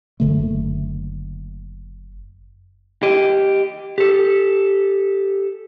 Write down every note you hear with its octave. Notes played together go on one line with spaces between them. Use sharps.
F#1 D3 A3
G4 D#5
G4 A4